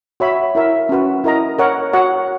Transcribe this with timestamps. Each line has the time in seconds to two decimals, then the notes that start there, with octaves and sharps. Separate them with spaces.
0.20 F#4 C#5 E5 B5
0.55 E4 A#4 E5
0.89 C#4 F#4 B4
1.24 E4 A#4 D#5 A#5
1.59 A#4 C#5 F#5
1.93 F#4 C#5 F#5